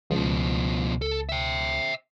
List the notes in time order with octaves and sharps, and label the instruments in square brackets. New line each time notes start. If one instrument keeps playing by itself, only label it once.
[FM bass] C#2 [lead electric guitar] B2 F3
[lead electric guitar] A4
E5 G5